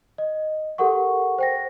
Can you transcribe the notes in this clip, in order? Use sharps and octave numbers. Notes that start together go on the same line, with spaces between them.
D#5
G4 A4 A#4 F#5 C#6
C5 G5 A#6